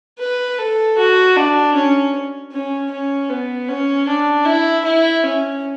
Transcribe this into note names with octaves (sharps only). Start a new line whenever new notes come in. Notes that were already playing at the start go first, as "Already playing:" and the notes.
B4
A4
F#4
D4
C#4
C#4
C#4
B3
C#4
D4
E4
E4
C#4